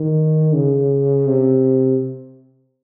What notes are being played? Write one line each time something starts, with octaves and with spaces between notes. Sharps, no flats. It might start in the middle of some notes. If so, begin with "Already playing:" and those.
Already playing: D#3
C#3
C3